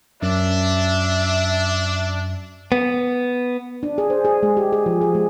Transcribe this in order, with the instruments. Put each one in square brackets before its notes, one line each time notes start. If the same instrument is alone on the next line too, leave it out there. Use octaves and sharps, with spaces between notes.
[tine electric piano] F#2 [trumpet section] D4 [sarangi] E5
[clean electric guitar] B3
[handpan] D4
G#4
C5
G#4
G#3
G4
G#4
F3
G#4
G#3